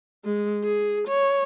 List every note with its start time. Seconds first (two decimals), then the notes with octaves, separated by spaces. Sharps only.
0.25 G#3
0.64 G#4
1.08 C#5